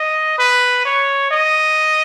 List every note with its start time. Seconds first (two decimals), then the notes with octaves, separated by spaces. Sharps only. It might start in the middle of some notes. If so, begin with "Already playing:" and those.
Already playing: D#5
0.38 B4
0.85 C#5
1.31 D#5